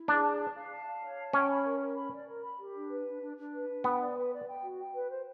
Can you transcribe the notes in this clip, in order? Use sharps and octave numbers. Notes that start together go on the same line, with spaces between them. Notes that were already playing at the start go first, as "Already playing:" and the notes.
Already playing: E4
D4 G#4
A5
A5
F5
A5
F5
C#5
A5
C#4 G5
B5
A#4
A#4
B5
D5
A#4
B5
G4
D4
B4
D4
D4
D4
B4
D4
B3 G5
D5
B4
D5
G5
F#4
G5
B4
C5